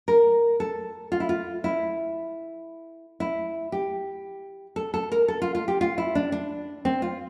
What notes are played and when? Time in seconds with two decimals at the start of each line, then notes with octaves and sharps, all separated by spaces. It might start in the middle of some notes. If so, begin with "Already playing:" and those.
0.08 A#4
0.60 A4
1.12 F4
1.20 E4
1.29 F4
1.64 E4
3.20 E4
3.72 G4
4.76 A4
4.94 A4
5.12 A#4
5.28 A4
5.42 F4
5.55 F4
5.68 G4
5.81 F4
5.98 E4
6.15 D4
6.32 D4
6.85 C4
7.02 F4